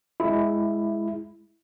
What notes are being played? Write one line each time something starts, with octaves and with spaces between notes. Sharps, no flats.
G#3 E4